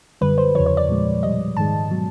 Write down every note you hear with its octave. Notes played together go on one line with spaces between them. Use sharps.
F#2 D3 G3 B4
C5
E2 C#3 F3 C#5
C#5
D5
A#2 F3 G#3
B2 G3 D#5
G#2 D#3 G#3 A5
B2 F#3